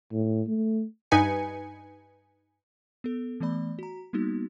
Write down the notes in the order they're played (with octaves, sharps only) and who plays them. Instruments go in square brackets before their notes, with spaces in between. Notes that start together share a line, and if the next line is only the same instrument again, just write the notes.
[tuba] A2
A3
[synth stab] G2 D#4 B4 G#5 C#7
[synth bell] B3 A4
E3 A3 B3 D5 B5
F#4 A#5
G3 A#3 B3 D#4 F#4